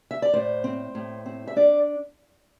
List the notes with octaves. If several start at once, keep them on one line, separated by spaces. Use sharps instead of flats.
E5
D5
A2 C5
C4
A2
C4
E5
D4 D5